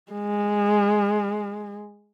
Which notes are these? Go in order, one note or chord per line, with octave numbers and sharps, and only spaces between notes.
G#3